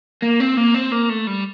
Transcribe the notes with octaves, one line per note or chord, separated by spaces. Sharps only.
A#3
C4
A#3
C4
A#3
A3
G3